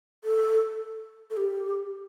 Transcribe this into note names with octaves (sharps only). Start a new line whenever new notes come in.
A4
A4
G4